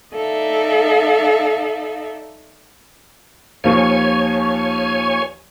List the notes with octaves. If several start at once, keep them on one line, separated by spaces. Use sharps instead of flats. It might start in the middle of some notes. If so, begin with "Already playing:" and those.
D#4 A4 D5 E5 F5
D#2 F3 C#5 G#5